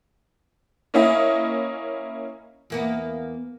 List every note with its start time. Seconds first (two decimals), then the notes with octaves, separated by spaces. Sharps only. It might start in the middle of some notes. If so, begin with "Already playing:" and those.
0.94 A#3 C#4 E4 D#5
2.70 E2 A#3 B3